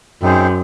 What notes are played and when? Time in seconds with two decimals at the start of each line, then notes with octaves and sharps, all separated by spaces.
0.22 F#2 C4 D#4 G#4 C5